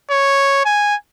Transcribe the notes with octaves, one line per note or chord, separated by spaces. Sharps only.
C#5
G#5